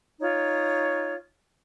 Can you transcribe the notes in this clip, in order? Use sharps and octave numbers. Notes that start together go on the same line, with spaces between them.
D#4 F4 C#5